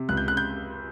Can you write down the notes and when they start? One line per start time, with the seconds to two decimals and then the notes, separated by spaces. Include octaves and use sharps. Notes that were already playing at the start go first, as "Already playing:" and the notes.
Already playing: C3
0.09 C#2 F#6
0.17 G6
0.27 C#3 F#6
0.37 G6